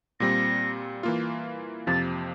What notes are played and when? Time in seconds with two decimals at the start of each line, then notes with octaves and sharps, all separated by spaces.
0.20 A#2 G3 C4 A#6
1.03 E3 A#3 F4
1.87 F2 C3 F3 A6